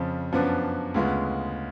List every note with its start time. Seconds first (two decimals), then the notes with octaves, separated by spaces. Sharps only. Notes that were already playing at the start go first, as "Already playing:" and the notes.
Already playing: F2 C#3 F3
0.33 F#2 F3 B3 D4
0.94 D2 C#3 G#3 B3 F4